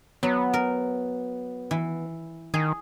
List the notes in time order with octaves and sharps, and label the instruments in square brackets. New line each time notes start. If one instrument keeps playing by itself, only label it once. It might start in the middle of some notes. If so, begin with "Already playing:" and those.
[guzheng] F#3 [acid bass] B3
[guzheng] A#4
E3
[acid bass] D#3 [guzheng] G#4